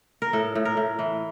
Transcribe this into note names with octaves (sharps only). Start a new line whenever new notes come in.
A#4
A2 A4
A2
A#4
A2
E3